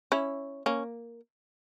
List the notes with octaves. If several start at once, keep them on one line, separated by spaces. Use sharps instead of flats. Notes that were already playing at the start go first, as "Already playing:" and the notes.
C#4 E4
A#3 C#4